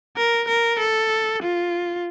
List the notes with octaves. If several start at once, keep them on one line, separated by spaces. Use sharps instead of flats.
A#4
A#4
A4
F4